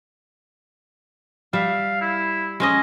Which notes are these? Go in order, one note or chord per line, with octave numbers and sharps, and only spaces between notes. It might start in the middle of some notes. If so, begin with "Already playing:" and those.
G3 E5 F5
E4
G#3 C#4 D#5